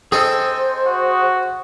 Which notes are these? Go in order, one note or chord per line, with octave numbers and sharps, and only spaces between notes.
C4 G#4 A4 C5 D#5 E6
F#4